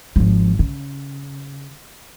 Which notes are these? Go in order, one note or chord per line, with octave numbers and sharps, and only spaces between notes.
G#1 F3
C#3